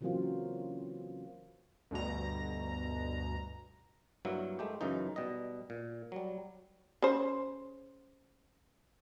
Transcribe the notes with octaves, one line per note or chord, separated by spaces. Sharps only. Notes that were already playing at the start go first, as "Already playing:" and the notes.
C#3 E3 F#3 A#3 C4 F4
D2 G2 B2 A#5
G2 F#3 A#3 E4
G#3 A3 G4
F#2 C#3 E3 D#4
B2 G3 D#5
A#2
F#3 G3
C#3 C5